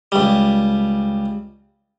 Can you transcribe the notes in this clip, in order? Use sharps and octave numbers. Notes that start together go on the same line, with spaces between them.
C#2 G3